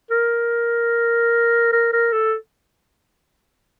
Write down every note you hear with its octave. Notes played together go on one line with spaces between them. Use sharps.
A#4
A#4
A#4
A4